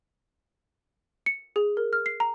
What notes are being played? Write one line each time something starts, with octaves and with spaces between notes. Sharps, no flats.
C#7
G#4
A#4
F6
C7
A#5